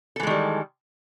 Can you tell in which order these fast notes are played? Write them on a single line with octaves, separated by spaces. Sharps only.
A4 E3 G#3 D#3 G3